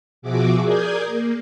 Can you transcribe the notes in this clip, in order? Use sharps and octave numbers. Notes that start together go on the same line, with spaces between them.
B2 F3 F#4 G#4 E5 D6
G#4 A#4 D5 D#6 G6 G#6
A#3